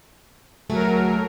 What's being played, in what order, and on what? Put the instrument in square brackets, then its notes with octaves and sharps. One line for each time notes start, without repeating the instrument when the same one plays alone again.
[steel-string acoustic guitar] D2 A3 G#4 [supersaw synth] F#3 A#4